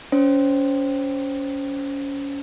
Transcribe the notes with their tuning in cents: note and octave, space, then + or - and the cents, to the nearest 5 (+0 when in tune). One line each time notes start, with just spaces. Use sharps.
C#4 +25 C5 +0